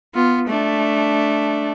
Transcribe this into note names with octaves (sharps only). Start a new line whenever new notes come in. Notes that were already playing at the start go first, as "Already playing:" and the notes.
B3 F4
A3 D4